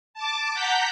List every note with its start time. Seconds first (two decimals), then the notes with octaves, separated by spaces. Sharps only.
0.14 A5 D6
0.54 F#5 A#5 G6 B6